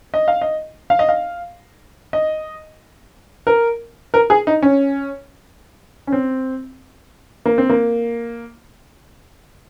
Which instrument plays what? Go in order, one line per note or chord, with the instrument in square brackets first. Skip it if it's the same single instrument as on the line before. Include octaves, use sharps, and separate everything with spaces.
[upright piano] D#5
F5
D#5
F5
D#5
F5
D#5
A#4
A#4
G#4
D#4
C#4
C#4
C4
A#3
C4
A#3